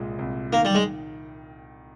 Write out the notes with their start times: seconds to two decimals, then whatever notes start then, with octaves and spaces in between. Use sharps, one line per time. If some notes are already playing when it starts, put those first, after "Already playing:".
Already playing: C2 A#2 G#3
0.19 C2
0.52 D#3 A#3
0.65 G3
0.75 G#3